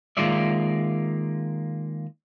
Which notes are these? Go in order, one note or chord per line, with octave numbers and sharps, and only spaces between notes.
D#3 G#3 A#3 F4 D5 E5